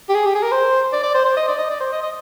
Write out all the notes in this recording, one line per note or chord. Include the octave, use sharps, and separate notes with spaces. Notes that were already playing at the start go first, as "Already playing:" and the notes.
G4
G#4
G4
G#4
A#4
C5
D5
D5
C5
C5
D#5
D5
D#5
D5
C5
D#5
D#5